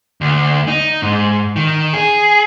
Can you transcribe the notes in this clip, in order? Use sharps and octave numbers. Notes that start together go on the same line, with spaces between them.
D2
D#4
G#2
D#3
G#4